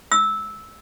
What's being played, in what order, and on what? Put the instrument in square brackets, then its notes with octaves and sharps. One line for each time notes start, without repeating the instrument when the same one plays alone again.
[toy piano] E6